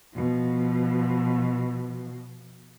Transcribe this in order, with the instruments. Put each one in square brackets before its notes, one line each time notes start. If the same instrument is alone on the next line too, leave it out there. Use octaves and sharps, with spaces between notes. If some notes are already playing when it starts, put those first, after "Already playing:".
[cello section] B2 F3